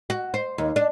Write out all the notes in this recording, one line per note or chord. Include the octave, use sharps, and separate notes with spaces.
F#4
C5
D#2
D4